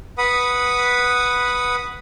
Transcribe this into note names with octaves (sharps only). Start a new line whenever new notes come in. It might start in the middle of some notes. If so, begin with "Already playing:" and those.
B4 F#5 B5 D#6